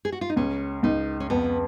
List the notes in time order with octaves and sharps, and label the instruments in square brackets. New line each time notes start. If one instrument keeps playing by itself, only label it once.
[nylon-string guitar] G#4
F#4
F4
D#4
[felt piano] C#2 [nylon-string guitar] C#4
[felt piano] C#2 [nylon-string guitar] D#4
[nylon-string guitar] C#4
[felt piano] F2 [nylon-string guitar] B3